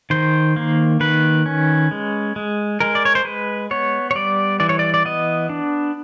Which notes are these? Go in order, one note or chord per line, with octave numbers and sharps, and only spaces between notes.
D#3 C5
A#3
D#3 B4
C#4
G#3
G#3
G#3 A#4
D5
C#5
C5
G#3 B4
B3 C#5
C#5
G3 D5
E3 D5
C#5
D5
D5
B3 D#5
D4